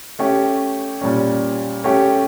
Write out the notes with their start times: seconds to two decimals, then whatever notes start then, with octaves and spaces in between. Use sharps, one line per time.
0.19 A3 C#4 G4
1.01 A#2 G3 C#4
1.84 A3 C#4 G4